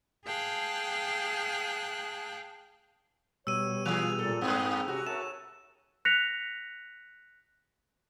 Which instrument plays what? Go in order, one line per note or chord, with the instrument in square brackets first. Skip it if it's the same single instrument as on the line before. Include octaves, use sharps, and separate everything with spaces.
[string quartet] G#4 F5 G5 A5 F#6
[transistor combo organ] B2 G3 [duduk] C#5 [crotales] E6 D#7
[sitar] E3 G#4 [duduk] F4 [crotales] F7
[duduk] A#2 [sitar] A4
[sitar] G2 A#3 G#4 [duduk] C4
[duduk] C3 [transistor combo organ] C#4 [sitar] F#4
[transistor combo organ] A#4 E5 A5 [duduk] C#5 [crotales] E7
[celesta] F#6 A#6 B6 C#7 F7